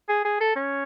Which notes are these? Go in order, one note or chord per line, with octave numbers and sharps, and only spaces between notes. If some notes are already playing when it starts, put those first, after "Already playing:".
G#4
G#4
A4
C#4